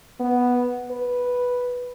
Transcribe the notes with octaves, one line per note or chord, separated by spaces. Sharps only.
B3
B4